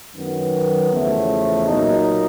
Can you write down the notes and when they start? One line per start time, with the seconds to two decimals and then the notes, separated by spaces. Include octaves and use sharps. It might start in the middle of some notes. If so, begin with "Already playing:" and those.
0.14 F#2 D#3 F#3 B3
0.89 E2 C#3 F3 A3
1.66 A#2 F#3 A#3 D#4